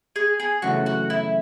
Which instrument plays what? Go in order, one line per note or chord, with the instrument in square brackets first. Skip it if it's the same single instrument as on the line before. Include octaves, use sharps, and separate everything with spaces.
[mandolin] G#4
G#4
[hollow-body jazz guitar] F#2 C#3 E3 A3 [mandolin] F#4
[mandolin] F#4
E4